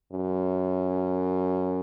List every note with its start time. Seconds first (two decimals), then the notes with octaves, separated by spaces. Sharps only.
0.12 F#2